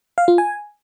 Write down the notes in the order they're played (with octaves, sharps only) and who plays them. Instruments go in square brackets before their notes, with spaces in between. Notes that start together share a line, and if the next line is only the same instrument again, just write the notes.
[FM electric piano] F5
F4
G#5